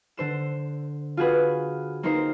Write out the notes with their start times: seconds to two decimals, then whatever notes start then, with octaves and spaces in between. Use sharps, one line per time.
0.17 D3 C5 E7
1.17 F4 F#4 G#4 B4
2.03 A#3 C4 D#4 A#4 C5